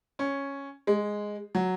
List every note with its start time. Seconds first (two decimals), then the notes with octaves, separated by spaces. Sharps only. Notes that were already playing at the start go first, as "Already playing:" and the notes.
0.19 C#4
0.87 G#3
1.55 F#3